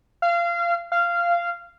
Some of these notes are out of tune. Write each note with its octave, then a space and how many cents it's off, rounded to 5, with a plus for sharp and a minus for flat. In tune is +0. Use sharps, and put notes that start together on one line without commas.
F5 -25
F5 -15